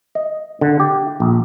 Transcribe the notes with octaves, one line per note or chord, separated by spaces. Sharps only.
D#5
D3
G4
A#1